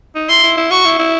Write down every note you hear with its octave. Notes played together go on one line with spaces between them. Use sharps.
D#4
E4 C6
E4
E4
F#4 C#6
E4
E4